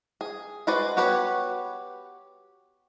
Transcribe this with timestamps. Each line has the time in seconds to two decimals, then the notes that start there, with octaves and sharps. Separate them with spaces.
0.21 G#4
0.67 G#3 F#4 B4 C5 D5
0.97 B3 F#4 G4 B4 C#5